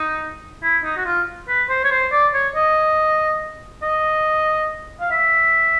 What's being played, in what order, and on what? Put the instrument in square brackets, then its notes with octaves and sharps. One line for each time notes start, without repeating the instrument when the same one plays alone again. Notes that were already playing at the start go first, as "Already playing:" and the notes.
Already playing: [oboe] D#4
E4
D#4
F#4
F4
B4
C5
C#5
C5
D5
C#5
D#5
D#5
F5
E5